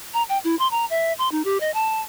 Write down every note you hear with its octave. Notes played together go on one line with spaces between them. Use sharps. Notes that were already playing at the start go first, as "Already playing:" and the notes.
A#5
G5
E4
C6
A#5
E5
C6
D#4
G4
D#5
A5